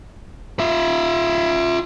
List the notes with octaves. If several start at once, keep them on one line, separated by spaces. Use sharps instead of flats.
F4 E5